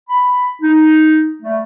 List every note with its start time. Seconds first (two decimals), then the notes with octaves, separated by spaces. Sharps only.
0.09 B5
0.62 D#4
1.42 G3 A3